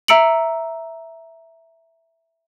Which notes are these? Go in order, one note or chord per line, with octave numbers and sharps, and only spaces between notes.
E5 A#5 E6 C#7 D7 F#7